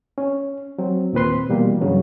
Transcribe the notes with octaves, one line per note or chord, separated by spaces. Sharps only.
C#4
F#3 C4
D#2 A#2 C4 B4 C6
B2 E3 G3 A#3
G2 C#3 E3 F#3